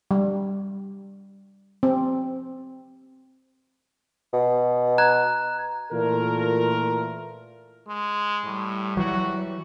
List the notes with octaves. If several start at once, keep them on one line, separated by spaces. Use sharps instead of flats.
G3
C4
B2
A#5 F#6 G#6
A#2 E3 A3 F4 A4 A#4
G#3
A2 G3
E3 F#3 F#4